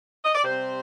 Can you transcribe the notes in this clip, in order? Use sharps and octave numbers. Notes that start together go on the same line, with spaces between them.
D#5
D5
C3 G3 C4 C5